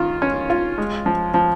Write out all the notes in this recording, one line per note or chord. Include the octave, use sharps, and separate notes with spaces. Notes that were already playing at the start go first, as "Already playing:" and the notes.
Already playing: D#3 F4
C#4
F4
G#3
F3
F3